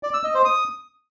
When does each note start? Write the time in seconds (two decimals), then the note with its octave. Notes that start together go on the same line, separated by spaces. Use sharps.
0.03 D5
0.14 E6
0.24 D#5
0.34 C5
0.45 D#6